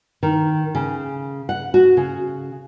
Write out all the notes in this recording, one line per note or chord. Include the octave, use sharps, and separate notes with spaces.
D#3
C#3
F#5
F#4
C#3